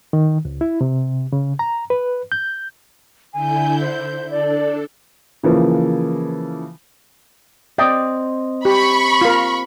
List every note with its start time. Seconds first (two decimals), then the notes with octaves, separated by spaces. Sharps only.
0.13 D#3
0.45 C#2
0.61 E4
0.81 C3
1.32 C#3
1.59 A#5
1.90 B4
2.32 G6
3.33 D3 E4 G#5 G6
3.81 C5
4.31 D4 A4 D5
5.43 C#3 E3 F3 A#3
7.78 C4 D5 D#5 G5
8.65 G4 B5 C#6
9.21 F4 A#4